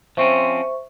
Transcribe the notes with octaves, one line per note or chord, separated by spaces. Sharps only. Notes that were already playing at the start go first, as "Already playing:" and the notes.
F3 C4 C#4 C5 E5 C#6